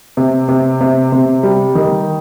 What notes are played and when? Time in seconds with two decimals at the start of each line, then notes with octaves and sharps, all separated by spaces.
0.17 C3
0.48 C3
0.81 C3
1.12 C3
1.43 G3
1.75 D#3